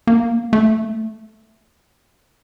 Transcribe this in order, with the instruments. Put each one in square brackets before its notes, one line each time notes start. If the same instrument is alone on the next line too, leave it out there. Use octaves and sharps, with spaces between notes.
[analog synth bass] A#3
A3